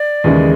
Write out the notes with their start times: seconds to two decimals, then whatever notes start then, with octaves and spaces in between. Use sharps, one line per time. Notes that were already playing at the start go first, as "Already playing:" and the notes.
Already playing: D5
0.24 D#2 C#3 E3 G#3